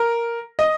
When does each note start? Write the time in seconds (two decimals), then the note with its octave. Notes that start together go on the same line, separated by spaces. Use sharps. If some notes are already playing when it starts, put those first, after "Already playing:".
Already playing: A#4
0.59 D#5